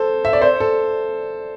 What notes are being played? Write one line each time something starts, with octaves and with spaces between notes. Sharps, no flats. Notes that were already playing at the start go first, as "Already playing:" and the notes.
Already playing: A4 C5
E5
D5
C5
A4